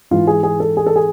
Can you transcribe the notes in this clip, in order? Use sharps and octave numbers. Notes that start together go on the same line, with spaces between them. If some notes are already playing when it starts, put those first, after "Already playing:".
G#2 E3 F4
G#4
G#4
A4
G#4
A4
G#4